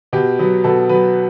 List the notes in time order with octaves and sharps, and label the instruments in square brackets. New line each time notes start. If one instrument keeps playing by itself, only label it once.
[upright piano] B2 G4
F#3 B3
B2 A4
F#3 B3 B4